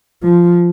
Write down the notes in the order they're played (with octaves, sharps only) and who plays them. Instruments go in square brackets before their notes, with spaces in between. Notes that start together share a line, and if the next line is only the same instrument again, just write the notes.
[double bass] F3